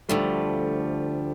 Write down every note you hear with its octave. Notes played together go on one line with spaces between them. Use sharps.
D2 D3 F3 G3 A3